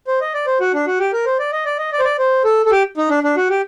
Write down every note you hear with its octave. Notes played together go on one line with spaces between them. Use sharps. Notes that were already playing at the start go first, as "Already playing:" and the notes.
C5
D#5
D5
C5
F#4
D4
F#4
G4
A#4
C5
D5
D#5
D5
D#5
D5
C5
D5
C5
A4
A4
G4
D#4
D4
D4
F#4
G4